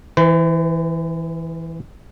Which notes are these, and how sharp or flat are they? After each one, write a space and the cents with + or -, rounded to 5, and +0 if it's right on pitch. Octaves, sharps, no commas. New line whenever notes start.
E3 -10 B4 +45